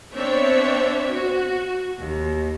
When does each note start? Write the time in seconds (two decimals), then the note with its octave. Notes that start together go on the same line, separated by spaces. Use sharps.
0.13 B3 C4 D4 C#5 E5
1.12 F#4
2.00 D#2